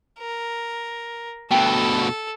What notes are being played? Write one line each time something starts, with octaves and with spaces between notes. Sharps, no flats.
A#4
D2 B2 A4 G5